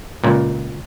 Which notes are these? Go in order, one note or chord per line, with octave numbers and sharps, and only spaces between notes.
C#2 A#2